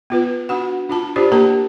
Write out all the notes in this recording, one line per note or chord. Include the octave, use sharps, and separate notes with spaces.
B3 F4 B4
D4 F#4 F#5
D4 F4 A5
D4 F4 G4 C5 D5
A#3 G4 A#4 A5 A#5